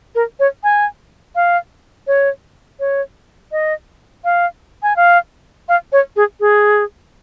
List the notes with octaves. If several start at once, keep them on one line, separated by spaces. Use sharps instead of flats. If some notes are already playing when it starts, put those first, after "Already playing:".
A#4
C#5
G#5
F5
C#5
C#5
D#5
F5
G#5
F5
F5
C#5
G#4
G#4